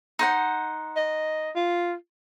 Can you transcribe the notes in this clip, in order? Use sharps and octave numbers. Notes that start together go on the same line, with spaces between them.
D#4 C5 F#5
D#5
F4